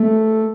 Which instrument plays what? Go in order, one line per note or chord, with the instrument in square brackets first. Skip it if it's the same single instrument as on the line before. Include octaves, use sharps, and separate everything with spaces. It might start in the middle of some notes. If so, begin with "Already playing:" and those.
Already playing: [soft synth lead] A3